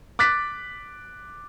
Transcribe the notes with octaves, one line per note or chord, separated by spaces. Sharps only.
D6 F#6 A6 B6